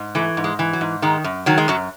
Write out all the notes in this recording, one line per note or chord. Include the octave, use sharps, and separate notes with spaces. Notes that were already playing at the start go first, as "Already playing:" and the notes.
Already playing: G#2
E3 A3
G#2
G#3
E3
F#3
G#2
D#3 G#3
F#2
D#3 F#3
G#3
F#2 F#3